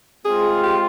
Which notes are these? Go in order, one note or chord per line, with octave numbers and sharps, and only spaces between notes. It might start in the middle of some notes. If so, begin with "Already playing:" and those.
G#3 C4 F4 G#4
G4